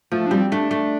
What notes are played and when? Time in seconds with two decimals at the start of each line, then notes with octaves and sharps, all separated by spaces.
0.12 F3 A3
0.26 D4
0.31 G3 C4
0.52 A3 D4
0.71 A3